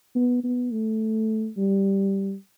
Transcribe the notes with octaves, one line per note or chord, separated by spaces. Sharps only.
B3
B3
A3
G3